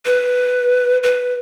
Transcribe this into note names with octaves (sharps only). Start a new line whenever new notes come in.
B4
B4